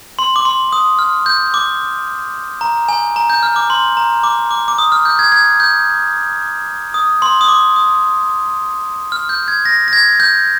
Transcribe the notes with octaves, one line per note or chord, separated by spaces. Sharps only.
C6
D6
C6
D#6
F6
G6
D6
A#5
G#5
A#5
G6
F6
D6
C6
A#5
D6
D6
D6
D#6
F6
G6
G#6
G#6
G6
D#6
C6
D#6
D6
D#6
F6
G6
G#6
A#6
A#6
G#6
G6